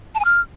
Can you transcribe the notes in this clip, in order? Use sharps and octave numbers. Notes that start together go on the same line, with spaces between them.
A5
G#5
F6